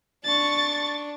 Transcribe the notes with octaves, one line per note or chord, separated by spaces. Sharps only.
D4 C#6 A6